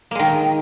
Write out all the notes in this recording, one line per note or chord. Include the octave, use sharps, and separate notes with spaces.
D#3 G#3 A#3